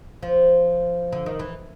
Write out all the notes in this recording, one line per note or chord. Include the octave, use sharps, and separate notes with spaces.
F3
D3
D#3
E3